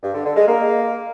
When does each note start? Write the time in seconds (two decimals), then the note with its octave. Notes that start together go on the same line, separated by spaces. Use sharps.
0.03 G2
0.14 D3
0.25 D3
0.36 G#3
0.47 A#3